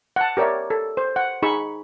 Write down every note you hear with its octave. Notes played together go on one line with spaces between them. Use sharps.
F#5 A5
G4 A#4 C#5 D5 E5
A4
C5
F#5
D#4 G#4 B5 C#6